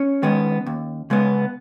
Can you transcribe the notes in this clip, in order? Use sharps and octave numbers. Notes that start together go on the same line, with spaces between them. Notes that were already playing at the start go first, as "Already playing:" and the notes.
Already playing: C#4 C#5
D#3 G#3 B3
D#2
C#3 G#3 B3